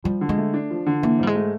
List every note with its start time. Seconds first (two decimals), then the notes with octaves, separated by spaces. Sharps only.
0.04 F3 G3
0.21 D3
0.29 G#3
0.38 A3
0.54 D4
0.71 F3
0.86 D3
1.02 E3 A#3
1.19 G#2 G3
1.27 G#3
1.35 A3